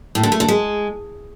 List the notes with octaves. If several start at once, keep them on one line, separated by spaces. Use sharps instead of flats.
A2
D3
A3
D3
G#3